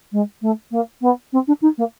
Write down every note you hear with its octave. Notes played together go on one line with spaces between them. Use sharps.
G#3
A3
A#3
B3
C4
D4
D#4
A#3